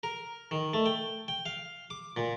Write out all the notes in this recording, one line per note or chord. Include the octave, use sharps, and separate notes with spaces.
A#4
D#3
A3
G5
G5
F5
D6
A#2